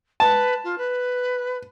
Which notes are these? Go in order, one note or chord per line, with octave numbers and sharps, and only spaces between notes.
B4 A5
F4
B4